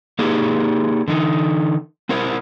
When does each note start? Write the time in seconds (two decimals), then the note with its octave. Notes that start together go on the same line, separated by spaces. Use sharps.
0.19 A#3 D#4 G4 G#4
1.08 D3 E3 D#4
2.09 C4 E4 A#4 C5